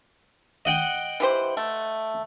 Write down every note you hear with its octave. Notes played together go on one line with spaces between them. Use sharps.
D#5 F#5 G5
E3 G4 C5
A3